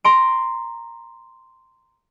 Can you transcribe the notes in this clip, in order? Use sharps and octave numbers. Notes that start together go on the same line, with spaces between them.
A#5 C6 D7